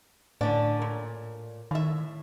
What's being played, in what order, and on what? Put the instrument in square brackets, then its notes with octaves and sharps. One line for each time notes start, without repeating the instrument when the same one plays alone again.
[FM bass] A2 [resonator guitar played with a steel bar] D3 C#4 D4
[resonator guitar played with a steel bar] A#2
[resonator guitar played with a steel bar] A2 E5 [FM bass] D#3